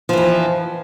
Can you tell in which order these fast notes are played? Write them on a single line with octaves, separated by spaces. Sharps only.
F3 E3 F2